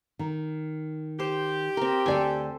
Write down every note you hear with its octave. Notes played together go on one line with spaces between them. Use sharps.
D#3
G4 C5
C4 A#4
D2 A4 C5 D5 G5 G#5